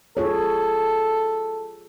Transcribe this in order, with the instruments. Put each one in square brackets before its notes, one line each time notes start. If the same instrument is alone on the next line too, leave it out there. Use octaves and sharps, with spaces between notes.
[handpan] F4 G#4 C#5 [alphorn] A4